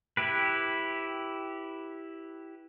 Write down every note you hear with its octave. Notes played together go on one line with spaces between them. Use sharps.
E4 G4 B4